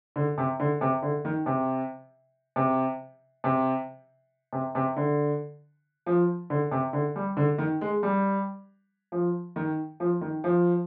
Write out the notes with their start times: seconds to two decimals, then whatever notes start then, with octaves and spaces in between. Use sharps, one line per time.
0.16 D3
0.38 C3
0.60 D3
0.81 C3
1.02 D3
1.25 D#3
1.46 C3
2.56 C3
3.44 C3
4.53 C3
4.75 C3
4.96 D3
6.06 F3
6.50 D3
6.71 C3
6.93 D3
7.16 G3
7.37 D3
7.58 D#3
7.81 G#3
8.03 G3
9.12 F3
9.56 D#3
10.00 F3
10.21 D#3
10.44 F3